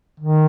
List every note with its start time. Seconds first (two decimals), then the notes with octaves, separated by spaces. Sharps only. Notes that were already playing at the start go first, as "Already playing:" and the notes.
0.20 D#3